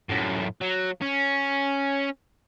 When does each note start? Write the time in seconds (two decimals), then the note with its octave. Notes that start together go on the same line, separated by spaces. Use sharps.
0.09 F#2 A2
0.61 F#3
1.02 C#4